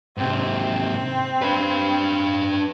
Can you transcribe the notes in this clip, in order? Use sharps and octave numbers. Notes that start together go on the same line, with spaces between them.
G#2 C3 C4
D4 B4